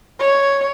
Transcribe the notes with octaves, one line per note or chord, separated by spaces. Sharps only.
C#5